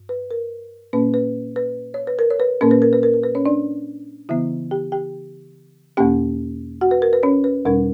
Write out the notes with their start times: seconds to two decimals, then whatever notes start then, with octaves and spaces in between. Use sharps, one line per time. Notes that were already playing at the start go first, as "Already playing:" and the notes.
Already playing: G2
0.09 B4
0.31 A#4
0.93 A#2 A#3 C#4 B4
1.14 B4
1.56 B4
1.94 C#5
2.07 B4
2.19 A#4
2.30 C#5
2.40 B4
2.61 A#2 A#3 C#4 A#4
2.71 B4
2.82 A#4
2.93 B4
3.03 A#4
3.14 A#4
3.23 B4
3.35 C#4 C#5
3.46 D4 D5
4.29 C#3 E3 B3 E4 E5
4.71 G4 G5
4.92 G4 G5
5.97 E2 B2 A#3 C#4 G4 G5
6.81 F#4 F#5
6.91 B4
7.02 A#4
7.13 B4
7.23 C#4 C#5
7.44 B4
7.65 E2 B2 G3 C#4 A#4